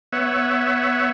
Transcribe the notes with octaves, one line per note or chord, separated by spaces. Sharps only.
B3 C#5 E5 F#5